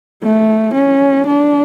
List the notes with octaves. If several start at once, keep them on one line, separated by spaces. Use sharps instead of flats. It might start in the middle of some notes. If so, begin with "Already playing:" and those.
A3
C#4
D4